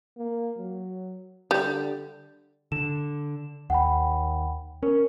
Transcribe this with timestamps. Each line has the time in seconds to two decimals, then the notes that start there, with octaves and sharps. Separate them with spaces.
0.17 A#3
0.57 F#3
1.51 D3 G3
2.72 D3 E7
3.70 D#2 F#5 G5 B5
4.83 C#4 A#4